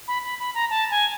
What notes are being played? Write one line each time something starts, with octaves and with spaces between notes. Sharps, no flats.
B5
B5
B5
A#5
A5
G#5